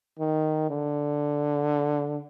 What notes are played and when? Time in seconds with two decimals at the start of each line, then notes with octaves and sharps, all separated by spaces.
0.19 D#3
0.70 D3